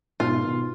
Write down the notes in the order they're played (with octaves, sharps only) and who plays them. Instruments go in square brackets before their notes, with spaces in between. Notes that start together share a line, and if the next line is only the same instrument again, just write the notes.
[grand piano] G#2 B2 [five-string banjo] F4
[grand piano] B2 D#3